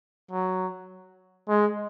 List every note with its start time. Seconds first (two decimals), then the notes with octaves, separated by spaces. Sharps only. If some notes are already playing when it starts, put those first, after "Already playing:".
0.31 F#3
1.48 G#3